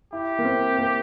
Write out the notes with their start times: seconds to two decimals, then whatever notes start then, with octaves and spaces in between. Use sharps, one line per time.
0.13 E4 G4
0.39 A#3
0.45 C4
0.79 A#3